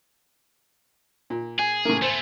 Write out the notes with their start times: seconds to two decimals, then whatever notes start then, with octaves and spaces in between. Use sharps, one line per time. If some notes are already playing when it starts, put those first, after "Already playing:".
1.30 A#2
1.59 G#4 G#5
1.85 A2 C#3 A#3
2.02 A3 B3 C5